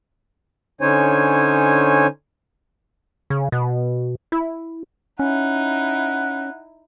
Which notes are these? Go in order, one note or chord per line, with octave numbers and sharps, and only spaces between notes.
D3 C#4 D#4 C5 C#5 G#5
C#3
B2
E4
C#4 D#4 E4 F#5